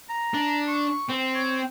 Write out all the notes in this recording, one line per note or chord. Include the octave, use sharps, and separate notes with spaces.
A#5
D4
C#6
C4
C#5